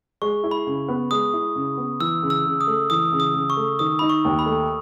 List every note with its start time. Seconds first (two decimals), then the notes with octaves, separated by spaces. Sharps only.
0.22 G#3 C#6
0.44 E4
0.51 B5
0.67 C#3
0.88 B3
1.11 G#3 D#6
1.33 E4
1.55 C#3
1.77 B3
2.00 E3 E6
2.22 C#3
2.30 E6
2.46 C#3
2.61 D#6
2.67 A3
2.90 E3 D#6
3.12 C#3
3.20 D#6
3.34 C#3
3.50 C#6
3.57 A3
3.79 D#3 D#6
3.99 D#4 B5
4.09 C#6
4.25 D#2
4.39 B5
4.46 A3